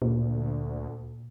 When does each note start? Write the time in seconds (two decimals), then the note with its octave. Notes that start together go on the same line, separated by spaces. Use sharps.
0.02 D2 A#2